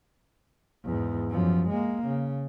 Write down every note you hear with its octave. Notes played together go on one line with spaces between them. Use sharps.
E2 G#2
F#2 F3
G#3 A#3
C#3